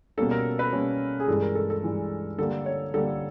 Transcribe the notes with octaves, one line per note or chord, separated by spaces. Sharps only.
B2 G3 A#3 C#4 A4
A#4
B4
B2 G3 A#3 C#4
G#4
G2 E3 G#3 A4
A#4
A4
A4
G2 E3 G#3
D3 G3 A#3 A4
C#5
D3 G3 A#3 A4